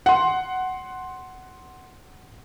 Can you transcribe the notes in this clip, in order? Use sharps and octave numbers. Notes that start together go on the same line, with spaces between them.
F#5 C6